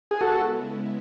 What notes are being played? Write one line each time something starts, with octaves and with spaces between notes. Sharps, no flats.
G#4
C#3 G#3 B3 E4 F#4 A4